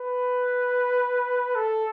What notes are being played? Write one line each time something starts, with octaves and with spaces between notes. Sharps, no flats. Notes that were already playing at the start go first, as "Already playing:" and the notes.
Already playing: B4
A4